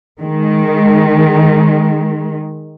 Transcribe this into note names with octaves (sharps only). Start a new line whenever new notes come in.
D#3 G#3